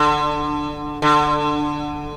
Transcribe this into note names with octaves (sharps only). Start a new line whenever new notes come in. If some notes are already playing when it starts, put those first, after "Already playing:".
Already playing: D3
D3